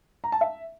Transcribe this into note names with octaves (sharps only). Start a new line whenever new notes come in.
A#5
A5
E5